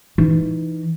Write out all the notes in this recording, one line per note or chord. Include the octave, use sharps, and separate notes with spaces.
E3 D#4